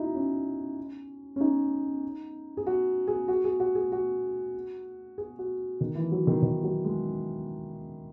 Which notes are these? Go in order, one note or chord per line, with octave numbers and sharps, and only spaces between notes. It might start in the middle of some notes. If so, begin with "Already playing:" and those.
Already playing: D#4 E4 F#4
C#4
C#4
D#4
G#4
F#4
G#4
F#4
G#4
F#4
G#4
F#4
G#4
F#4
D#3
E3
F#3
D#3
D#3
F#3
G#3